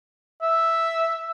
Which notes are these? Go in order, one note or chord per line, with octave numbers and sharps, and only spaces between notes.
E5